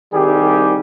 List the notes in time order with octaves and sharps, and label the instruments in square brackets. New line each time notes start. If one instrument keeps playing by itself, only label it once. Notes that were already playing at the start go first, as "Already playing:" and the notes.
[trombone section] C2 D#3 G3 G4 G#4